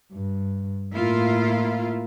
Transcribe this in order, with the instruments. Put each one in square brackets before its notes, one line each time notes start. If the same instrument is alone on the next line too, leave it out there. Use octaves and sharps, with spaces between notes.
[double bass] G2
[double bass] A2 A#3 [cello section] E4 F4